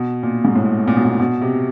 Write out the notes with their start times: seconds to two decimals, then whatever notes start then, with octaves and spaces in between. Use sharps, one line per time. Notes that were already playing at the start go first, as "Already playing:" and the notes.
Already playing: B2
0.23 A#2
0.45 G#2
0.55 A2
0.88 A#2
0.96 B2
1.05 A#2
1.19 B2
1.42 C3